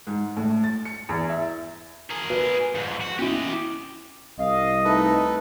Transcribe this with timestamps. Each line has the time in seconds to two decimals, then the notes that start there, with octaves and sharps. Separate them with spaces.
0.07 G#2
0.37 A2
0.64 A6
0.85 C#7
1.09 E2
1.29 E5
2.10 G#4 A#4
2.30 B4
2.75 F2 G#2
3.01 F#4
3.19 C#4 E4 G4 D#5
4.39 C2 D#5 F5
4.84 A3 D#4 A4 B4